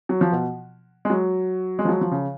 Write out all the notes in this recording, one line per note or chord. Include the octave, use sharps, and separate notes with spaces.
F#3
F3
B2
G#3
F#3
G#3
F3
F#3
F3
C#3